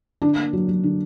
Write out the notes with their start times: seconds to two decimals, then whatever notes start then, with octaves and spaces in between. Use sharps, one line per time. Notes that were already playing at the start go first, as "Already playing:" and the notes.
0.22 D3 D4
0.37 A#3
0.53 F#3
0.68 F#3
0.83 D3